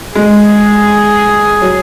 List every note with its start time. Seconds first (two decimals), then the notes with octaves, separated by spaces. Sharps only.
0.15 G#3 G#4
1.62 F#3